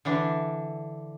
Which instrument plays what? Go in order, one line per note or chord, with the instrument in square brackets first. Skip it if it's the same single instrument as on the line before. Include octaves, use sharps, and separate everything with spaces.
[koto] D3 E3 D4